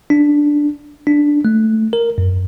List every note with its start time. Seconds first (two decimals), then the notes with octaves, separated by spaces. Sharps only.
0.10 D4
1.07 D4
1.45 A3
1.93 A#4
2.18 F#2